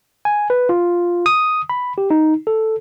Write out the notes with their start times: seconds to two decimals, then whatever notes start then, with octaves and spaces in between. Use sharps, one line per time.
0.25 G#5
0.50 B4
0.69 F4
1.26 D#6
1.70 B5
1.98 G4
2.10 D#4
2.47 A4